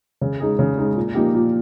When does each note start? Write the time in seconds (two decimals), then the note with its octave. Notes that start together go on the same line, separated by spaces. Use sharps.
0.21 C#3
0.40 G#3 D#4 G#4
0.59 C#3
0.78 G#3 D#4 G#4
0.96 A#2
1.15 F3 A#3 D#4 G4
1.35 A#2